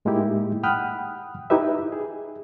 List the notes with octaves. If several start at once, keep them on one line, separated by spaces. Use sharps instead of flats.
A2 G#3 A#3 D#4 E4 G4
F#5 G5 B5 D#6 F6 F#6
D#4 E4 G4 B4 E5
G#4